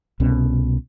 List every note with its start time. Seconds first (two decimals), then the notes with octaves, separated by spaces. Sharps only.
0.20 C2 B2 C#4